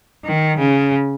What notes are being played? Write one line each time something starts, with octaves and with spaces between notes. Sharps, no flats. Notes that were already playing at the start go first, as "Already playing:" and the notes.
D#3
C#3